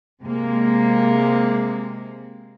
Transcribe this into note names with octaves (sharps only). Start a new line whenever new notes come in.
C3 G#3 A#3